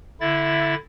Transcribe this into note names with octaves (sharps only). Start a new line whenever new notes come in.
D3 E4 E5 A6